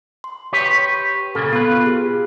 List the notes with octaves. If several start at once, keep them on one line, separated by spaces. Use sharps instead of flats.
C6
G4 B4 C#5
C#6
A#2 C#3 A#3 A4
B3 F4 B4 F6
G4 G#4